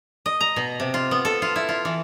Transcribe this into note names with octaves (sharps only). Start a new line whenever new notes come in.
D#5
A#5
B2
C3
F4
B3
A4
F4
E4
F4
E3